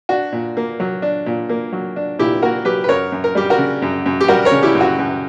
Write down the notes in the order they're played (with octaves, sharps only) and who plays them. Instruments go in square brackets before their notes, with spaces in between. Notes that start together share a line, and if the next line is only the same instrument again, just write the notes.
[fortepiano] D4 F#4
A#2
A#3
F#3
D4
A#2
A#3
F#3
D4
A#2 E4 G4
A#3 F#4 A#4
F#3 G4 B4
B4
F#2 A#4 C#5
F#2
A#4
G3 G4
F#4 A#4
C#3
F#2
F#2
G4
G3 F#4 A#4
A#4 C#5
C#3
E4 G4
F#2
F#4
F#2